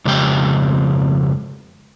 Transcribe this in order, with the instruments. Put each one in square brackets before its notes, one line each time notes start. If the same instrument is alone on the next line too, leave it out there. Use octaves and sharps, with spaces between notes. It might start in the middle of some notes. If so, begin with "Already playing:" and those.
[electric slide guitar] F2 C#3 G#3 G4 G5